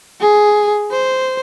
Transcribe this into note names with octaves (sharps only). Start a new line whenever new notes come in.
G#4
C5